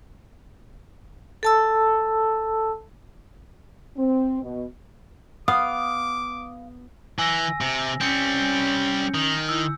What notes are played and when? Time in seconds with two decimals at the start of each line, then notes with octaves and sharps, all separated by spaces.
1.43 A4 A5 E6
3.97 C4
4.43 B2
5.48 B3 F5 D6 D#6
7.19 E3 G#5 E6 A#6
7.61 C3
8.01 G3 C4 C#4 G6 C#7
9.15 D#3
9.49 E4 E6